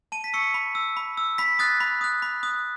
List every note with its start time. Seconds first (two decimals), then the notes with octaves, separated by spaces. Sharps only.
0.12 A5 D#7
0.24 B6
0.34 C#6 E6 C#7
0.54 B5
0.75 E6
0.97 B5
1.17 E6
1.38 B5 B6
1.59 D#6 F#6 A6
1.80 B5
2.01 D#6 F#6
2.22 B5
2.43 D#6 F#6